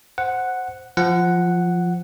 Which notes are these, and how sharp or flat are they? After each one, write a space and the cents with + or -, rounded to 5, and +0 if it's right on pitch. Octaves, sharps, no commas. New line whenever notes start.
C5 +0 F#5 +0
F3 +0 F#5 +0